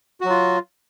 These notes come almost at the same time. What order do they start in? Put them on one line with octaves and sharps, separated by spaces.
F#4 F#3 F4